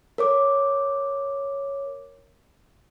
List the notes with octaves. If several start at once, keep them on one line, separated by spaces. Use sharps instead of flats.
A#4 C#5 D6